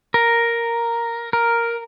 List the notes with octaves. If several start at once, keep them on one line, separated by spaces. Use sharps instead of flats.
A#4
A#4